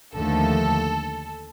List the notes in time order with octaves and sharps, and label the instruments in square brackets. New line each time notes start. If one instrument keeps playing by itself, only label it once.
[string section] D#2 D3 F3 A3 A4